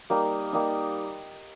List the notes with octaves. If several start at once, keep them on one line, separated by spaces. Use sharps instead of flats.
G3 A#3 D#4
G3 A#3 D#4